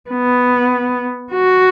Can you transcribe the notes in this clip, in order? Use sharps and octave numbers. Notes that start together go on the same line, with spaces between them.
B3
F#4